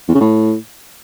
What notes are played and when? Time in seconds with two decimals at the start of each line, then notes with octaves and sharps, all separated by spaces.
0.08 E2
0.15 C#3
0.21 A2